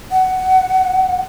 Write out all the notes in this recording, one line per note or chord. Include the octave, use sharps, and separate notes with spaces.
F#5